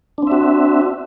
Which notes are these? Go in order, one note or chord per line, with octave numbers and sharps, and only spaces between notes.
C4 D4 F#4 E5